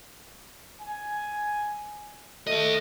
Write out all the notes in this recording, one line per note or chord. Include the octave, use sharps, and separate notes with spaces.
G#5
D#2 A3 D#5